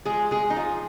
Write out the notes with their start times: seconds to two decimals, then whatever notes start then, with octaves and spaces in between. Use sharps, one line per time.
0.05 F3 G#3 G#4
0.31 G#3 G#4
0.44 G#3
0.50 D#4
0.56 F3 F4